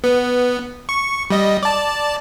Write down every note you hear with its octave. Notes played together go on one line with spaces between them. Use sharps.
B3
C#6
G3 D#5
D5 A5